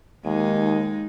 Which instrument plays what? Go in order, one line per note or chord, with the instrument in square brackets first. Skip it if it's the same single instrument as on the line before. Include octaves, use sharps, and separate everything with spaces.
[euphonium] D#2 [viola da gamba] G#3 D#4